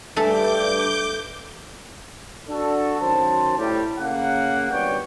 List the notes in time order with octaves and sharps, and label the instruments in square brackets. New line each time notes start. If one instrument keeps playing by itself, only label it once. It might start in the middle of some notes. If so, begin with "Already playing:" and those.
[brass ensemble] G2 [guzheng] A3 A4 E5 [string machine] D6 G6
[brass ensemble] D4 F#4 A4
F#2 D#3 C5 A5
A2 G3
C#3 A#3 F#5
G#1 G2 B3 C#5 D5 G5